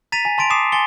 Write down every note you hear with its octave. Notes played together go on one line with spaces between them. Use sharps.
A#5 A6 B6 D#7 F7
G#5
A5 C6 A6 D7 F7
D6 D#6 C7 E7
G#5 C6 A6 C#7 G7